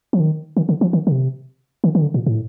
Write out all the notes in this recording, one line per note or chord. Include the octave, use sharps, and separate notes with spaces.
F3
D#3
D#3
D3
F3
D#3
D3
C3
D#3
D#3
D3
A#2
A2